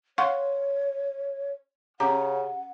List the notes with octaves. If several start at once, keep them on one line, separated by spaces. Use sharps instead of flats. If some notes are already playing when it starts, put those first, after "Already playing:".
C#5 F5 F#5 C6 C#6
C#3 C#4 G4 F#5 A#5